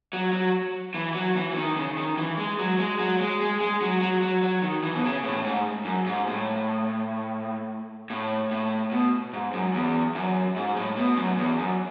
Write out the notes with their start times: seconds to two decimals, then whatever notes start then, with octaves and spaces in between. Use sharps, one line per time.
0.13 F#3
0.33 F#3
0.94 E3
1.15 F#3
1.36 E3
1.51 E3
1.56 D#3
1.77 C#3
1.97 D#3
2.18 E3
2.38 G#3
2.59 F#3
2.79 G#3
2.99 F#3
3.20 G#3
3.41 G#3
3.60 G#3
3.82 F#3
4.01 F#3
4.23 F#3
4.43 F#3
4.62 D#3
4.83 E3
4.95 B2
5.03 C#3
5.24 A2
5.44 G#2
5.85 F#2
6.06 G#2
6.27 A2
8.10 A2
8.51 A2
8.92 B2
9.34 G#2
9.53 F#2
9.74 E2
10.15 F#2
10.56 G#2
10.76 A2
10.96 B2
11.17 F#2
11.38 E2
11.59 F#2